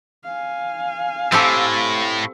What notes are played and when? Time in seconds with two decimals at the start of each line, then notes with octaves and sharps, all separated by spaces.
0.24 F5 G#5
1.32 A2 C4 G4 A4